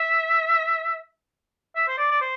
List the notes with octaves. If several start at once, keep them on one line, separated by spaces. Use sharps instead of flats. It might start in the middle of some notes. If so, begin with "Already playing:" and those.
Already playing: E5
E5
C5
D5
D5
C5